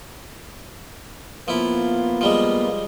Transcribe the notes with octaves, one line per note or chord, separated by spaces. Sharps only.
F3 A#3 B3 E4 F4
F3 G3 G#3